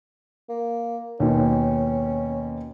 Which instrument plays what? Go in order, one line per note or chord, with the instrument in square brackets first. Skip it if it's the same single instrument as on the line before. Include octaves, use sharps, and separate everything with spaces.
[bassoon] A#3
[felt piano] D#2 B2 [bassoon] C#4